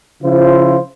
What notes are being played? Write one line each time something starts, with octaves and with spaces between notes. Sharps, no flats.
C#3 F3 E4 F4 C5